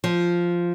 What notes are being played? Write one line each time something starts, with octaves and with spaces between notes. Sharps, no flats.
F3